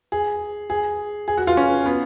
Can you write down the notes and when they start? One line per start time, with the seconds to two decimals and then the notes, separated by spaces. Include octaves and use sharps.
0.12 G#4
0.70 G#4
1.28 G#4
1.37 F#4
1.47 F4
1.57 C#4
1.86 B3